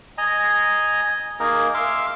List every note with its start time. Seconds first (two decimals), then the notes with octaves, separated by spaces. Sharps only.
0.18 D#5 G#5 A#5
1.40 A#3 D#4 G#4 A#4
1.74 E5 F5 C6 D6